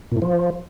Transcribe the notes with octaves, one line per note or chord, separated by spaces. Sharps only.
A#2
A2
F3